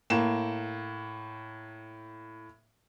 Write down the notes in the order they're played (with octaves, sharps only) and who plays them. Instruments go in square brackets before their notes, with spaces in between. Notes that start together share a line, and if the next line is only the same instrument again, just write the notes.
[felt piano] A2 A#3 E7